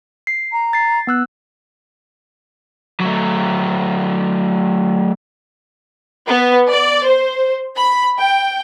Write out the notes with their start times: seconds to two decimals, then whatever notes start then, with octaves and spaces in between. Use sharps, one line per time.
0.27 C7
0.52 A#5
0.73 A6 C7
1.07 B3 E6 F#6
3.00 F#3 A3
6.26 B3
6.69 D5
7.05 C5
7.77 B5
8.18 G5